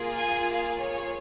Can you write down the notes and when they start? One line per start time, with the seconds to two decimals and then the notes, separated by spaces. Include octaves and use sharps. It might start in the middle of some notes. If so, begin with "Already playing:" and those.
Already playing: A#3 F4 G#4
0.17 G#5
0.49 F5
0.80 C#5